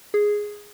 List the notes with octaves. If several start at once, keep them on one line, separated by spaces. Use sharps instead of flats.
G#4